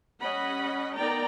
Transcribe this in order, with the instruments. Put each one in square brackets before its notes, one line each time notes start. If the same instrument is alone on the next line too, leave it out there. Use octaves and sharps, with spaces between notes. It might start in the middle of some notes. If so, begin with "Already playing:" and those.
[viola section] G3 C#4 D#5 F#5 B5
B3 D#4 A#4 D5 G5 A#5